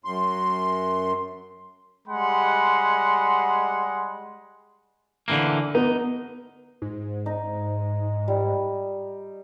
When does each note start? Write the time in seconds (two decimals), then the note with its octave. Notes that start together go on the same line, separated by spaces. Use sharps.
0.05 F#2 C6
2.08 G3 G#3 F#5 B5 C6
5.28 D3 E3 A#3
5.75 B3 D#4
6.82 G#2
7.26 D#4
8.28 G3